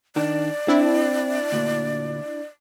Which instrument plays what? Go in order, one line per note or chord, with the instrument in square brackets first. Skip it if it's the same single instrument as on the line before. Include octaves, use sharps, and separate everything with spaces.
[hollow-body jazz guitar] D#3 D4 [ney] D5
[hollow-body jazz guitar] C4 [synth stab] D4 E4
[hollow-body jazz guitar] D2 A#2